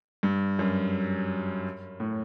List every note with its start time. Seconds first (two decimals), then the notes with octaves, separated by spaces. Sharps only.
0.23 G2
0.59 F#2
2.00 A2